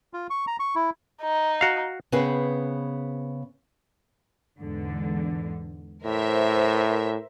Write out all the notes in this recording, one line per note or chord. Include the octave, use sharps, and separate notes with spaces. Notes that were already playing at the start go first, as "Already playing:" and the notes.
F4
C#6
A#5
C#6
E4
D#4
F#4 F5
C#3 B3 C4 G#4 B4
E2 G#2 D3
A2 A#4 C5 E5